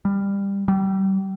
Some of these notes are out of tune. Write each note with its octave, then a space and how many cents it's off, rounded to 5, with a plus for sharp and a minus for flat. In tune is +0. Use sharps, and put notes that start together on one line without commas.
G3 +20
G3 -30